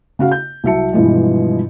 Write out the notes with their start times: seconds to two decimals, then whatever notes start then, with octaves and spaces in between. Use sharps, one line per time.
0.19 C#3 F#4 F5
0.31 G6
0.64 C2 F#3 F#4 E5 A5 C#7
0.93 G2 B2 E3 F3 G#3